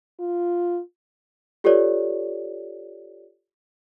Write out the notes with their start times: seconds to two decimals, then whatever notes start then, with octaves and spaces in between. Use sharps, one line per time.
0.20 F4
1.64 F4 G4 A4 B4 C#5 D5